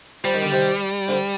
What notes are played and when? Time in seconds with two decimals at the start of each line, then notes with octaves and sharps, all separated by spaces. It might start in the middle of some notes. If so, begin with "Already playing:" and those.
0.24 F3 G3
0.33 D#3
0.42 D3
0.52 C3 D#3
1.08 D3 F3